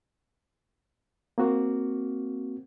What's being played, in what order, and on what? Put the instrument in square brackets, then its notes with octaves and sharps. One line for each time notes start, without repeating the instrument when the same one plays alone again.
[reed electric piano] A#3 C4 F#4